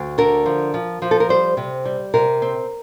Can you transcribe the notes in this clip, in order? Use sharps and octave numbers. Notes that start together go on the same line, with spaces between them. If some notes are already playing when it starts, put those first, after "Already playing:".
Already playing: D2
D3 A#4
F3
F3
F3
A4
A#4
G3 C5
C3
G3
C3 A#4
C4